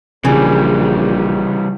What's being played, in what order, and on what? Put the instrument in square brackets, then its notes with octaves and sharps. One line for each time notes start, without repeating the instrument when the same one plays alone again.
[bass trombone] A#1 [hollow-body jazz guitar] C#3 [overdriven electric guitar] E3 G3